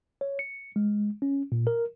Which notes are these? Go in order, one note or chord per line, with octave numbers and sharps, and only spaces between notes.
C#5
C#7
G#3
C#4
A#2
A#4